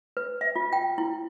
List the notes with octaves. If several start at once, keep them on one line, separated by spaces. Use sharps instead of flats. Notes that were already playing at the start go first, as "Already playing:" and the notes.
B4
E5
F4
G5
E4